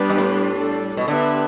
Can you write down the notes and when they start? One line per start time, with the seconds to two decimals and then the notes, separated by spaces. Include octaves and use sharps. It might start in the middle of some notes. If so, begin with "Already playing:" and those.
Already playing: G3 B3 D4 G4 B4
0.10 G2
0.18 A2
0.49 G3 D4 A4
0.97 B2
1.08 D3 B3 G4 B4 E5